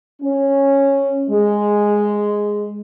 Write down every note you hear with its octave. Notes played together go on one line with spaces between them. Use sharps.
C#4
G#3